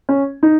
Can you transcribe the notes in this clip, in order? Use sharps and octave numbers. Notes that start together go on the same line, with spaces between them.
C#4
D#4